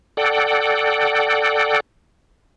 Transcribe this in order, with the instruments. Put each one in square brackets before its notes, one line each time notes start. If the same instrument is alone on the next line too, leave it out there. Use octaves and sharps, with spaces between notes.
[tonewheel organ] A4 D5 F#5 G5